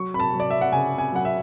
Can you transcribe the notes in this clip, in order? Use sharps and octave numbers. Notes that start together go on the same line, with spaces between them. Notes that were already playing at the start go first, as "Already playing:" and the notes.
Already playing: F#3 C#6
B5
A5
F#3
D5
E5
F#5
C#3 G#5
G#5
F#3 F#5
E5